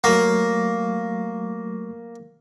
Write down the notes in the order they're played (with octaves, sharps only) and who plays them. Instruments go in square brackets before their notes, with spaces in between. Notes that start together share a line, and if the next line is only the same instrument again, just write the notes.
[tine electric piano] F#3 A3 C#6 [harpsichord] A#3